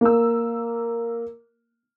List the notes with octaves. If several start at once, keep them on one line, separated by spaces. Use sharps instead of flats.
A#3 E6